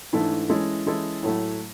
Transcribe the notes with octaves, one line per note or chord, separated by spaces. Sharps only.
G#2 E3 A3 D4
E3 G#3 C#4 E4 A4
E3 G#3 C#4 E4 A4
A2 F#3 A3 E4